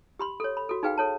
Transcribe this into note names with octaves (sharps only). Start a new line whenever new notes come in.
G4 B5 C6
A4 C#5
B5
F#4 A4
D#4 G#4 B4 F5 G5
A4 C#5 A5